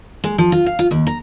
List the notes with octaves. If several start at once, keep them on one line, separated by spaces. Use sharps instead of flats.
G#3
F3
F4
F5
F4
D#2
A#5